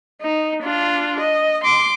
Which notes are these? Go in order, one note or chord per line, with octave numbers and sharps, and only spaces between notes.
D#4
D4 F4
D#5
C6 D6